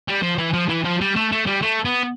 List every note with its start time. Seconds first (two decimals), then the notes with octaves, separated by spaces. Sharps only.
0.08 G3
0.22 F3
0.38 E3
0.53 F3
0.69 E3
0.85 F3
1.01 G3
1.16 A3
1.32 A3
1.47 G3
1.62 A3
1.85 B3